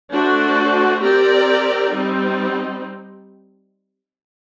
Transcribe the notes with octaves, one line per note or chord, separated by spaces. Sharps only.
A3 D4 F#4 C5
C4 G4 A#4 D5
G3 C4 D#4